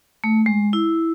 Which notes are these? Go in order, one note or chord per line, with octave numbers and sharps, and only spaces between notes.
A3
G#3
E4